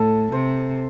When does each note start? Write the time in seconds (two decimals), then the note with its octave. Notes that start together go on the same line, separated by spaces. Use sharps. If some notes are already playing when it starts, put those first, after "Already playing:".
Already playing: A2 A4
0.32 C3 C5